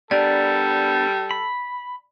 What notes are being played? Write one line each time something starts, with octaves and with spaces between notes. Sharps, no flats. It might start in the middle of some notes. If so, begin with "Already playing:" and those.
G3 B3 D4 A4 A#4 D5
B5